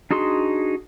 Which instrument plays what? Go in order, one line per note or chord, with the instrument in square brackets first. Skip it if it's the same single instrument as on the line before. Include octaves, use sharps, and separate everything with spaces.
[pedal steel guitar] D4 D#4 F#4 G#4 C6